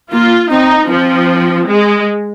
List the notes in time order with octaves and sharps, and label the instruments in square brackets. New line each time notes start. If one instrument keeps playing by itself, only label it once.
[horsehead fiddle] A#3 [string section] F4
[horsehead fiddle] C4 [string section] D#4
[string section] F3 [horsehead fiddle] C4
[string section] G#3